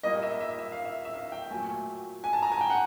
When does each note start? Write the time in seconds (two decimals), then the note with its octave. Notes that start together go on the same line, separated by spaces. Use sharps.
0.03 A#2 G3 A#3 D#5
0.22 E5
0.40 E5
0.59 E5
0.72 F5
0.85 E5
1.05 E5
1.14 F5
1.32 G5
1.50 A#2 F#3 A3 G#5
2.24 G#5
2.33 A5
2.42 A#5
2.52 G#5
2.61 G5
2.70 F#5